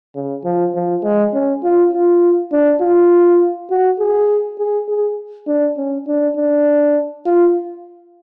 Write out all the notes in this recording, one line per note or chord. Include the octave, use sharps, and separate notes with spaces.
C#3
F3
F3
G#3
C#4
F4
F4
D4
F4
F#4
G#4
G#4
G#4
D4
C#4
D4
D4
F4